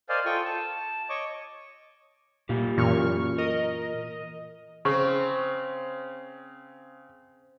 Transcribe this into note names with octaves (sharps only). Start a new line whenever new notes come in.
A#4 C5 D5 D#5 F5 G#5
F4 A4 G5 C#6 D#6
A5
C#5 D#5 C#6 D6
A#2 A#3 F4 G4
F#2 A#2 E3 C#6 F6
A#4 D#5
C#3 C4 C#6